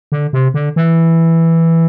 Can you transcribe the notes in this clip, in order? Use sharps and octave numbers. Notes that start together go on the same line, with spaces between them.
D3
C3
D3
E3